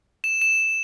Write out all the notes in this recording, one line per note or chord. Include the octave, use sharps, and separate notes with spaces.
E7
E7